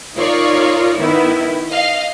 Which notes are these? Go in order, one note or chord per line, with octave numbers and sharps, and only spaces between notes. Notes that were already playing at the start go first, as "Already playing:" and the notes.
D#4 F4 A#4 C#5 D5
D#3 B3 E4
D#5 F5